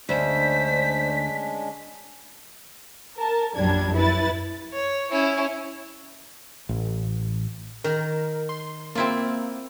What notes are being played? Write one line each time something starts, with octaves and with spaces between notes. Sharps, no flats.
D2 G#3 C#4 D4 C5 B6
A#4 A5
A#1 F#2 F#3 G3 D4 G#6
F#2 E4 B4 A6
C#5
C#4 E4
A1
D#3 A#4
C6
A#3 C4 E4 F4